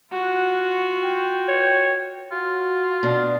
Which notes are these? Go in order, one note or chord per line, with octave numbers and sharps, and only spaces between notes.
F4 F#4 F#5
G5
C#5
F4 F#4
B2 D4